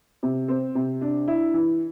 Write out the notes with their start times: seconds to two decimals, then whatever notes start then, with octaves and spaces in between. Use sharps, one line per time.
0.23 C3
0.48 C4
0.75 C3
1.01 D4
1.28 E4
1.54 E3